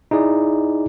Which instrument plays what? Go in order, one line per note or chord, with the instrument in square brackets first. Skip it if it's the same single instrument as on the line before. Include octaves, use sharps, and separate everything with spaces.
[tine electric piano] D#4 E4 G#4 D5